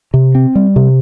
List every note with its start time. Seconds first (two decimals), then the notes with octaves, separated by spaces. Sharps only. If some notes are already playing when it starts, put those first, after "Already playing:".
0.14 C3
0.35 C4
0.55 G3
0.76 C3